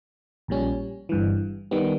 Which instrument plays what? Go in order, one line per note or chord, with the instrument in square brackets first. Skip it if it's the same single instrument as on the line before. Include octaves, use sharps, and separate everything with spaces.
[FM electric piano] A#1 A#2 G3 C#4
G1 G2 E3
D#3 G3 B3